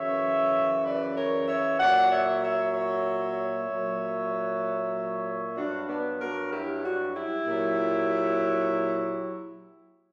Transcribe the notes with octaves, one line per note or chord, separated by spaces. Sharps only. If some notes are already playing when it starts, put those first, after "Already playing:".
Already playing: F#2 C#3 E3 C#5 E5
B4 D5
A#4 C#5
C#5 E5
A#2 F#3 D5 F#5
C#5 E5
C#5 E5
C#5 E5
A#2 F#3
G2 F#3 D4 F#4
B3 D4
F#4 A#4
E4 G4
D4 F#4
E4 G4
A#2 F#3